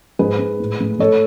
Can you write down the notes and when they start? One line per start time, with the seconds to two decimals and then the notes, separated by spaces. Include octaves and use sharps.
0.19 G#2 G#4 B4
0.39 G#2
0.60 A2
0.80 A3
0.99 A3 A4 C#5